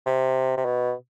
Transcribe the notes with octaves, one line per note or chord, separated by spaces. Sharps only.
C3
C3
B2